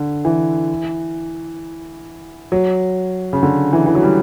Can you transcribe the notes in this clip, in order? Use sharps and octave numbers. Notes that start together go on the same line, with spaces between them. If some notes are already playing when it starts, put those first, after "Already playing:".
Already playing: D3
E3
F#3
C#3
D3
E3
E3
F#3
G3